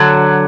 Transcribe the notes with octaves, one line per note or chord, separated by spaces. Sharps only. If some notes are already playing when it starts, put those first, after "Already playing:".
Already playing: D3 F#3